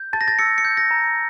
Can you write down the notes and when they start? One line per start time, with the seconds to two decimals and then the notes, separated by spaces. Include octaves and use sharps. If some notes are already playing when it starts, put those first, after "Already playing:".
Already playing: G6
0.13 A5 A6
0.21 A#6
0.28 A6
0.39 E6 C#7
0.58 C#7
0.65 G6
0.77 A#6
0.91 A#5